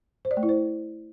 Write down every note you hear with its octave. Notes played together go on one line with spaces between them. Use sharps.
C5
D5
A3
E4
C5